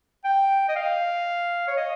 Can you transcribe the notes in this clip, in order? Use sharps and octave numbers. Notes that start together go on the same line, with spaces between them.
G5
D#5
F5
C#5
D#5